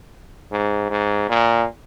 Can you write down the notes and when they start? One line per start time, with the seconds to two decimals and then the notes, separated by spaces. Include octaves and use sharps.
0.52 G#2
0.90 G#2
1.30 A#2